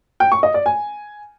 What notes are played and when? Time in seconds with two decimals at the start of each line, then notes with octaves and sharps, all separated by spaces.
0.20 G5
0.32 C#6
0.43 D#5
0.54 D5
0.66 G#5